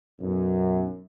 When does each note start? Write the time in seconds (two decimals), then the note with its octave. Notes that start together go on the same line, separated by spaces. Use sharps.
0.20 B1 F#2